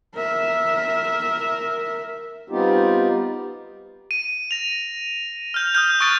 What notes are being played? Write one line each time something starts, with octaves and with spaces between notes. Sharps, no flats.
A#4 E5
G3 B3 C4 D#4 F4 G4
D#7
A#6 F7
F6 G6 F7
D#6 F6 G6
C#6 D#6 F#6 G6 A6 D7